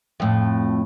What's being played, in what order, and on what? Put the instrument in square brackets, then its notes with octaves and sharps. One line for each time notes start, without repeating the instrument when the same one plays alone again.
[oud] F2 A2